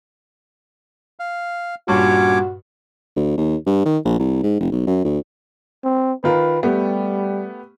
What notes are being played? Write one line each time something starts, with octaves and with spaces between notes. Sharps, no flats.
F5
G2 A#2 C#4 F#4 C#5 D6
D2
D#2
G2
D#3
A#1
C2
G#2
F1
B1
F#2
D2
C4
D#3 F4 A#4 B4
G3 A3 B3 G4